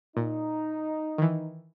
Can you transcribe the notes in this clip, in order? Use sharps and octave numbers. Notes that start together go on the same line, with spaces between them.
A#2 D#4
D#3 E3